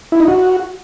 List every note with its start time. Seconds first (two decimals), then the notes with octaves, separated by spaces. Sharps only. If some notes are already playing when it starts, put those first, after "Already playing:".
0.12 E4
0.20 D#4
0.28 F#4